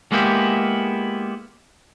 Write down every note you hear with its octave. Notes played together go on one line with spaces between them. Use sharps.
G#3 A#3 B3 E4 G4